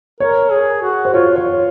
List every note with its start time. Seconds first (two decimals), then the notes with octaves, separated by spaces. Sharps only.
0.20 A#4 C#5
0.51 G#4
0.83 F#4
1.05 C5
1.13 F4 C#5
1.36 C#5